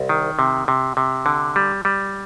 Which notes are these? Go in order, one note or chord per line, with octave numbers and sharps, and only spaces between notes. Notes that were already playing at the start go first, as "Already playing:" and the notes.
Already playing: C2
D#3
C3
C3
C3
D3
G3
G3